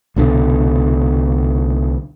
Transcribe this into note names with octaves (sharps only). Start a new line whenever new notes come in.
C2 B2 D3